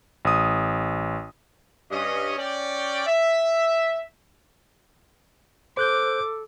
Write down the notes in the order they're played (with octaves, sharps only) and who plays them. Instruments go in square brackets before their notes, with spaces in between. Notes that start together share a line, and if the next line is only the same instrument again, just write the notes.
[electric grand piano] A1 D#6
[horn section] G2 C#4 D#5
C#4 D5 G5
E5
[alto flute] A4 [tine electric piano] C5 F#6 G6 [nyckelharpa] D6